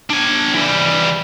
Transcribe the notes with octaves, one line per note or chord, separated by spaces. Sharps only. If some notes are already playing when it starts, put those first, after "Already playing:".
D4 G#5
E3 G3